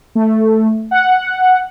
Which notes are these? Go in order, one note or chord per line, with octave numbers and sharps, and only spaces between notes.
A3
F#5